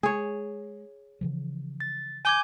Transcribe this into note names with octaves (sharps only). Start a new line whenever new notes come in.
G#3 G#4 C#5
C#3 E3 F3
A6
G#5 D6 G6 G#6